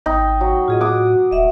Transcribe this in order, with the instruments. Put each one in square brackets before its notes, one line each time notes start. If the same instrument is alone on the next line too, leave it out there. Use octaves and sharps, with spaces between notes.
[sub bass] G#1 [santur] D#4 [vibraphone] G5
[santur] F#3
[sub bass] A2 [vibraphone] F4 G#4 D#5
[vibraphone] F#4 [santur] D6 D#6
[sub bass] D#1 [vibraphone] D#5 E5 F#5